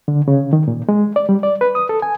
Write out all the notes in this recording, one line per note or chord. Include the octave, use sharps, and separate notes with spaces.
D3
C#3
D#3
A#2
G#3
D5
G3
D5
B4
D#6
A4
G#5